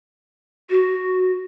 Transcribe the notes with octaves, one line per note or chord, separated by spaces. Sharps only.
F#4